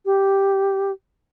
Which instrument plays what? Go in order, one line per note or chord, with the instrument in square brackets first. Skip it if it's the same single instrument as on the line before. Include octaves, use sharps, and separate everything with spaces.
[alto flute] G4